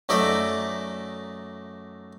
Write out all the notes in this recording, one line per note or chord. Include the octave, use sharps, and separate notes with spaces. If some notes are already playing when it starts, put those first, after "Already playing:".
F#2 A3 D#4 D5 E5